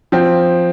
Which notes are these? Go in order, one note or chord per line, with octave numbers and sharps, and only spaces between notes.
F3 C4